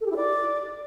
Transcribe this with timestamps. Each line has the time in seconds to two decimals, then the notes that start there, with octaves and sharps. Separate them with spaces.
0.01 A4
0.06 G4
0.11 E4
0.16 D5